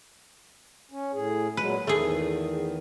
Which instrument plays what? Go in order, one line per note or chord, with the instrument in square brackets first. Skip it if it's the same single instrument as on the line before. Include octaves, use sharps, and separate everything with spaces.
[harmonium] C#4
A2 G#4
[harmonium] A#2 F#3 G#3 [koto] B4
[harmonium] E2 D#3 [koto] A3 G#4